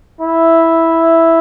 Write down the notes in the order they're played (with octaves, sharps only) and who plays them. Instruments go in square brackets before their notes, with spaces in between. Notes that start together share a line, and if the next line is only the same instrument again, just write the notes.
[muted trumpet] E4